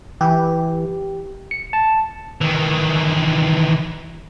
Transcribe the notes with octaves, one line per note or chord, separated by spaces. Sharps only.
E3 G4
C#7
A5
D#3 E3